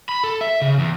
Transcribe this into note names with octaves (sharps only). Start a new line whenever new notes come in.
B5
A4
E5
C#3
E2